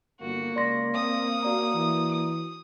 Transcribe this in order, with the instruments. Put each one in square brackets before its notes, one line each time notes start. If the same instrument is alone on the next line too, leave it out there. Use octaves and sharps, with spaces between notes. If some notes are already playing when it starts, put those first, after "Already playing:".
[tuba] G1 [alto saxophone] A#3 [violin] F#4
[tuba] C#2 [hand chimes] D5 C6 A#6
[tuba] C4 [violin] D#6
[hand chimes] F#4 D5 A#5
[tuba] E3
[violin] D#6